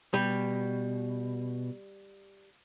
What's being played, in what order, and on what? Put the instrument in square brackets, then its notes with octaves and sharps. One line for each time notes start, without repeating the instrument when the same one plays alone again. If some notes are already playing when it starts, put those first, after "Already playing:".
[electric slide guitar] B2 [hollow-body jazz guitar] G3